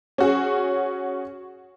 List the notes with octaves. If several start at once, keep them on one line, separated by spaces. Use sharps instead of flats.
C#4 F#4 G#4